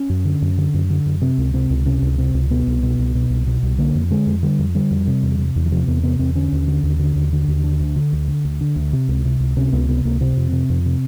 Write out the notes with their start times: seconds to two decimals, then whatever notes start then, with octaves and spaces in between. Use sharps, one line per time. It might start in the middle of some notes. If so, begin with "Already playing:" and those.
Already playing: C#4
0.10 F#2
0.25 D3
0.42 F#2
0.58 D3
0.74 F#2
0.90 D3
1.06 F#2
1.21 C3 C4
1.38 C#2
1.54 C3 C4
1.70 C#2
1.86 C3 C#4
2.02 C#2
2.18 C3 C4
2.34 C#2
2.50 B2 B3
2.67 C2
2.83 B2
2.99 C2
3.15 B2
3.30 C2
3.47 B2
3.63 C2
3.78 D3 A#3
3.95 F2
4.10 D3 G#3
4.26 F2
4.43 D3 G3
4.59 F2
4.75 D3 G3
4.91 F2
5.07 C3
5.23 E2
5.39 C3
5.56 E2
5.66 E3
5.72 C3 F3
5.87 E2 B3
6.03 C3 B3
6.19 E2 C4
6.35 D3 C#4
6.52 D#2
6.68 D3
6.83 D#2
6.99 D3
7.16 D#2
7.33 D3
7.48 D#2
7.63 D3 D4
7.80 D2
7.96 D3
8.13 D2
8.28 D3
8.45 D2
8.61 D3
8.76 D2
8.93 C3
9.08 C#2
9.25 C3
9.40 C#2
9.57 C3 C#4
9.72 C#2 B3
9.89 C3 B3
10.05 C#2 A#3
10.21 C3 C4
10.37 F2
10.52 C3
10.70 F2
10.86 C3